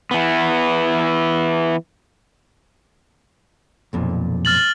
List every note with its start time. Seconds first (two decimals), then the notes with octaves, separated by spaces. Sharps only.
0.11 E3 B3
3.93 B1 F2 A#2
4.45 F6 A6 F#7